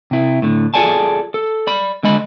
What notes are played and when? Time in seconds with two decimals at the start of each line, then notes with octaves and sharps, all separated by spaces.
0.11 C3 E4
0.42 A2 D3
0.74 F4 G#4 A4 D5 G#5 A5
1.34 A4
1.67 D5 B5
2.03 D3 G#3 D#5 B5